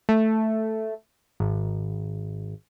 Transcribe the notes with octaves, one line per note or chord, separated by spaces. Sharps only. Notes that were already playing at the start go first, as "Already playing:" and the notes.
A3
G#1